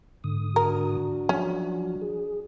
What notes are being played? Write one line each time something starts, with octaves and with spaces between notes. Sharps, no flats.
G#2 D3 D#6
D4 F#4 A#4
F3 F#3 C#4
G#4